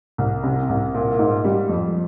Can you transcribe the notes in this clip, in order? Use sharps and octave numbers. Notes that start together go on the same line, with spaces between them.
C2
C3
C2
A#2
G#2
G3
F2